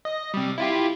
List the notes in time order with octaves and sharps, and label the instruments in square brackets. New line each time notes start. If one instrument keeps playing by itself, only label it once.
[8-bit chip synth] D#5
C3 G3
E4 F4 G4